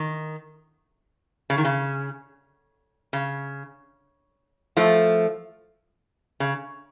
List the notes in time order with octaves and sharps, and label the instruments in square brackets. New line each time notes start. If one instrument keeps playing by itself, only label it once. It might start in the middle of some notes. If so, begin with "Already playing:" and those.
Already playing: [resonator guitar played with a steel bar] D#3
C#3
D#3
C#3
C#3
F3 A3
C#3